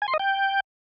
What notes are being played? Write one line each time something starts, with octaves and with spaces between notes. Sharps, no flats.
G#5
C6
D#5
G5